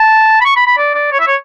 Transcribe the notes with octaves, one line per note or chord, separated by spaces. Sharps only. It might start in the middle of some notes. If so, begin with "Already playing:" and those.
Already playing: A5
B5
C#6
B5
B5
D5
D5
C#5
E5
C#5